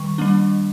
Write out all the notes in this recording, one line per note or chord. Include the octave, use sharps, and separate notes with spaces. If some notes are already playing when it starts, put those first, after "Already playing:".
Already playing: D#3 G3 C#6
G3 A#3 D4